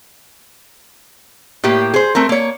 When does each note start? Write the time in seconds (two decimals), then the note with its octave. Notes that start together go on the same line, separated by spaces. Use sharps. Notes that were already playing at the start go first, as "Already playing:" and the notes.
1.64 A2 A#3 G4
1.94 G#4 C5
2.15 A3 C4 A#4
2.29 A#3 C#5